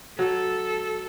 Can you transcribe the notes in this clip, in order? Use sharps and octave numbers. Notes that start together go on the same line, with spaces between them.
F#3 A4